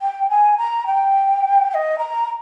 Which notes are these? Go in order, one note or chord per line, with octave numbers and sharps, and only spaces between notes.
G5
G#5
A#5
G5
G5
D#5
A#5